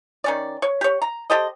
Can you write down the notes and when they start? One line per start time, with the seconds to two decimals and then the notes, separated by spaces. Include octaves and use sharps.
0.24 D#3 C#4 D5
0.62 C#5
0.81 G4 C#5
1.02 A#5
1.30 G4 A4 C5 D#5